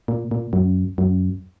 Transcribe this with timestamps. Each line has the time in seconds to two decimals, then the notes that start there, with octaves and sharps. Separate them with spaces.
0.08 A#2
0.31 A#2
0.53 F#2
0.98 F#2